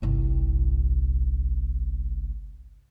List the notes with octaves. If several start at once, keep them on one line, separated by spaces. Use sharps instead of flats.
G1 C2